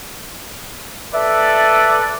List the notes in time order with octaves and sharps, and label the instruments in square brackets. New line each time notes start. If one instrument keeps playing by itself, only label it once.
[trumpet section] A4 B4 D5 [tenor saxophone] E5